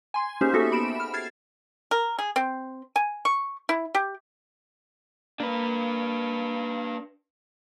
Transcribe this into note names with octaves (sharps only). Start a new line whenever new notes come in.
G#5 C6
A#3 C#4 D#4 G4 G#4 C5
B3 F#4 G4 A4 E5
B5 D7 E7
F6
F6 G#6 A6 C7
A#4
G#4
C4
G#5
C#6
E4
G4
A#3 D4 B4